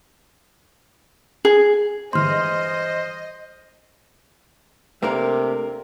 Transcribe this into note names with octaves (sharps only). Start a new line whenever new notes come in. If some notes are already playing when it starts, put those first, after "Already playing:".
G#4
G2 E3 G#3 C5 D#5 C6 F6
C3 A3 A#3 D4 A#4